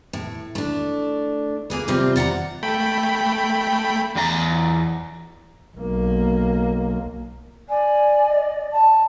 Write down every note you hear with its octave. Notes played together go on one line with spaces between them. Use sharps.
A2
A3 D4
A#3 G#4 B4
C3 G3 C4 F4 C5
D5 F#5 G5 A#5
A3 G5 B5
E2 D#4 A#5
B1 A#3
D5 G#5
D#5
A5